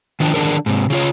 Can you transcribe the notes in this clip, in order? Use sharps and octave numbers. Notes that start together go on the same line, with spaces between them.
D#3 F3 D4
D3 D#3 D4 G#4 A#4
G#2 C3
C#3 F4 C#5